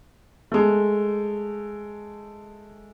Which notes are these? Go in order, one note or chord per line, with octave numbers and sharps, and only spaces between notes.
G#3 A3